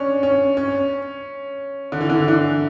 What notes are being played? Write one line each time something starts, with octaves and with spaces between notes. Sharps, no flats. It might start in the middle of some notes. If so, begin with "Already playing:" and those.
Already playing: C#4 D4
C#4
C#4
D3
E3
D3
E3
D3